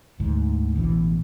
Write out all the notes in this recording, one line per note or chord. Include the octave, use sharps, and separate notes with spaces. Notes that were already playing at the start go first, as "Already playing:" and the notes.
D2 G#2
A1 B2 E3